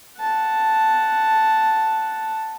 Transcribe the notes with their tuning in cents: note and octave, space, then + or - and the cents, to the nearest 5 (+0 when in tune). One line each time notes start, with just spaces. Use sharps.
F#5 +0 A5 +0